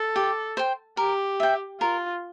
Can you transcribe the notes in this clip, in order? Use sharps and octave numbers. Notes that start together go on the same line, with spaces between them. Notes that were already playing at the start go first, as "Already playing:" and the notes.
Already playing: A4
G4
C5 G5
G4 A#4
E5 G5
F4 A#4